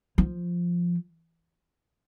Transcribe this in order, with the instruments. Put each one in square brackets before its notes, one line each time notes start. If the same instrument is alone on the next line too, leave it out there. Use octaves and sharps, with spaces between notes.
[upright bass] F3